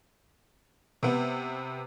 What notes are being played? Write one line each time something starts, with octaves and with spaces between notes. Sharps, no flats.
C3 B3